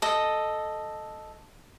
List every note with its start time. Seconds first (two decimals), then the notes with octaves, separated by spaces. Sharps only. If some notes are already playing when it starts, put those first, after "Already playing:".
0.02 A4 D#5